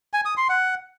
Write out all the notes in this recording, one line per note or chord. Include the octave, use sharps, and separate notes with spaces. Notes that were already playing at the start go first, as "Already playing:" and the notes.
G#5
D#6
C6
F#5